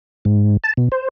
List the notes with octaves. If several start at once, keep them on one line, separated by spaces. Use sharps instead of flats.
G#2
A5
B2
C5